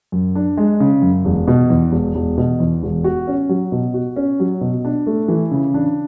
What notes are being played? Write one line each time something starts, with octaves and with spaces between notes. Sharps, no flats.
F#2
D4
G#3
C#3
F#2
E1
B2
E2
E1
E1
B2
E2
E1
F#4
C#4
F#3
B2
F#4
C#4
F#3
B2
D4
A3
E3
C#3
D4